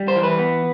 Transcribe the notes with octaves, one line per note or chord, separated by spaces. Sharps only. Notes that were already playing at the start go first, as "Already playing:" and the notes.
Already playing: G3
C5
E3
B4
B3